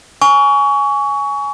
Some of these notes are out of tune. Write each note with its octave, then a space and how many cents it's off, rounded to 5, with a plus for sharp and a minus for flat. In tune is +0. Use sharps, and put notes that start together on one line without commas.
G#5 +0 C#6 +25